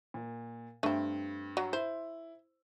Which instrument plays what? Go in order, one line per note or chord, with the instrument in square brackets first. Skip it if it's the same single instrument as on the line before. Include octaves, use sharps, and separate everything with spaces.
[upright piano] A#2
[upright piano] G2 [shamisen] A3 C4
[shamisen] F#3
[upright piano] E4 [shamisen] C5